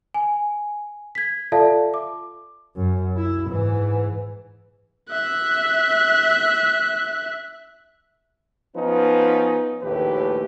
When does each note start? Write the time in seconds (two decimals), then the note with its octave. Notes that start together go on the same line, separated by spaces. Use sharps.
0.14 G#5
1.15 G#6 B6
1.52 F4 A4 D5 E5 F5 A5
1.94 D6
2.76 F#2
3.16 E4
3.50 G#2 E3
5.10 E5 F#6
8.77 F3 B3 C#4 D#4 B4
9.83 A#1 D#2 A2 G4 B4